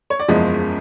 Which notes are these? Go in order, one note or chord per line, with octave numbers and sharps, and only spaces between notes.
C#5
D5
F#1 E2 C#3 F3 G#3 D#5